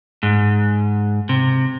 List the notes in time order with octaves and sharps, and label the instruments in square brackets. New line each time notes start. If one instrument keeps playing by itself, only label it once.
[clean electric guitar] G#2
C3